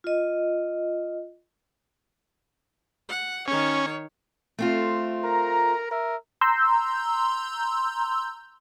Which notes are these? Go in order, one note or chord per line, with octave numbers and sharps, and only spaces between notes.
F4 D#5
F#5
D#3 C#4 C#5
A3 C4 F4
A#4 A#5
A#4 E5
A#5 C6 E6 G6